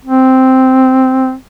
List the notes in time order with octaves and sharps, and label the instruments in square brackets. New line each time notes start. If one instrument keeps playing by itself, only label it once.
[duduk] C4